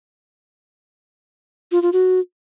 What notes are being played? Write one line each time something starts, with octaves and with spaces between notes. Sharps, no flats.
F4
F4
F#4